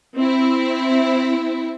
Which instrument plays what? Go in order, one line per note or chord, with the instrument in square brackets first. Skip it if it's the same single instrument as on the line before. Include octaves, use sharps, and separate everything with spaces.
[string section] C4 E4